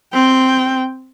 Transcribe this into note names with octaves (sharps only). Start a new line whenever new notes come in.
C4 G5